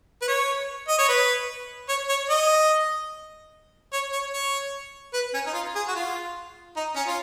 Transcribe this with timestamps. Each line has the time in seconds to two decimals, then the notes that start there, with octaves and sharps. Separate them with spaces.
0.22 B4
0.28 C#5
0.88 D#5
0.99 C#5
1.08 B4
1.89 C#5
2.09 C#5
2.30 D#5
3.93 C#5
4.12 C#5
4.33 C#5
5.13 B4
5.34 C#4
5.46 D#4
5.54 F4
5.75 G#4
5.88 F#4
5.95 F4
6.76 D#4
6.96 C#4
7.07 F4